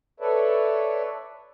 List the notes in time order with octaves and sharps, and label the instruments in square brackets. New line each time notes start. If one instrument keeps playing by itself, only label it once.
[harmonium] A4 B4 C#5 D5 E5